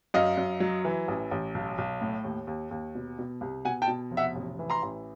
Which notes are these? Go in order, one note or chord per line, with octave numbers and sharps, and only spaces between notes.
F#2 D#5 F5
F#2
F#3
E3
A1
A1
B1
B1
A2
D#2
D#2
D#2
B2
B2
C2
B2 F#5 G#5
G5 A5
B2
F1
E5 F#5
A1
E3
A#5 C6
A1